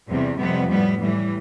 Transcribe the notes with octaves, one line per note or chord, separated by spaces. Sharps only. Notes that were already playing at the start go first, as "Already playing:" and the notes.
E2 C3 G3
F2 C3 G3 B3
A2 G3 B3
A2 E3 G3